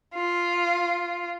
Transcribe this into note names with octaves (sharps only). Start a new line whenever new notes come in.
F4